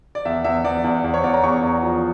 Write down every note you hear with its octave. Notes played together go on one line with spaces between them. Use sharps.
D5
E2 E5
E2 E5
E2 D5
E2
E2
C#5
E2 D5
A#5
E2 C#6
E2
F3